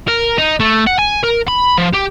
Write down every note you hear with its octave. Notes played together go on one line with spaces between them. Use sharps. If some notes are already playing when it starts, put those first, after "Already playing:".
A#4
D#4
A3
F#5
G#5
A#4
B5
F3
G4